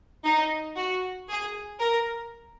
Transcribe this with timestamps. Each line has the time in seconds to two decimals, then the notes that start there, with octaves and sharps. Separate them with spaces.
0.24 D#4
0.76 F#4
1.28 G#4
1.80 A#4